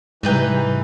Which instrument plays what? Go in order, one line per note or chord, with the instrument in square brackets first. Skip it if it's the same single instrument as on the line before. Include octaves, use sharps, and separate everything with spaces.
[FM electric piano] G#2 [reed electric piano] C3 G3 G#3 [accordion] E3 [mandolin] D#4 B4 G5